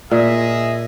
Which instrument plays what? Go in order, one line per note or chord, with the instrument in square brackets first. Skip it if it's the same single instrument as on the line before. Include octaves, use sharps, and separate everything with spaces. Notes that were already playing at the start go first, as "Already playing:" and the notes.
[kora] A#2 [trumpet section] G#4 D#5 E5